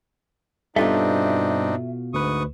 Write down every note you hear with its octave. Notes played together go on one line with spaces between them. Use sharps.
G2 B2 C4 D4 D#4 F4 A4 E5
D2 G#2 B4 C#6 D#6